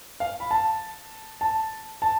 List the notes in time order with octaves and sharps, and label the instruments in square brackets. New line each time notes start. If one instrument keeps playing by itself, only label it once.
[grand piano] F5
B5
A5
A5
A5